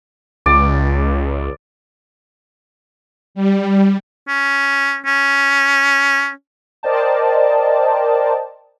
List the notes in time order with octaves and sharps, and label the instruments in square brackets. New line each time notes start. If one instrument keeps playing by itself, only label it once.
[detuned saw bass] C#2 [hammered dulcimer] D5
[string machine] G3
[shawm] C#4
C#4
[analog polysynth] A#4 C5 D5 D#5 G5 A5